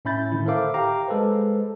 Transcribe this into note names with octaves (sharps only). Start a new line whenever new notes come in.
A2 C#4 E5 B5 G6 A6
A2 D3 D#3 E4
A4 A#4 C5 E5 F5 D6
G4 F5 G5 A#5 D6
G#3 A4 B4 C5